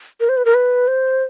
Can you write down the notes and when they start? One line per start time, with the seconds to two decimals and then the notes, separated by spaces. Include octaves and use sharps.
0.20 A#4
0.29 C5
0.37 B4
0.45 A#4
0.54 B4
0.88 C5